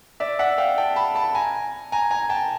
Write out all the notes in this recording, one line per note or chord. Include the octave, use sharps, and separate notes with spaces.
D5 E5
E5 F#5
F5 G5
G5 A5
A5 B5
A5 B5
G#5 A#5
G#5 A#5
G#5 A#5
G5 A5